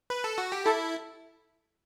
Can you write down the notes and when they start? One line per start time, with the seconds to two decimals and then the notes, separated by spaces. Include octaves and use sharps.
0.10 B4
0.24 A4
0.38 F#4
0.52 G4
0.66 E4 A4